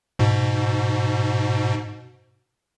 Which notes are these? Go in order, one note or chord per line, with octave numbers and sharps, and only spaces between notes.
G#2 B2